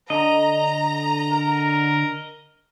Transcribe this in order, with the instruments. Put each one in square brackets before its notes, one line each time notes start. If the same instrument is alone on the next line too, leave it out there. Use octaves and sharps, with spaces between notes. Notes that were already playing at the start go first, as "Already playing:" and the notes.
[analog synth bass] D3 [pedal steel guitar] D#5 [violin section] A#5
[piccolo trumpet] A#4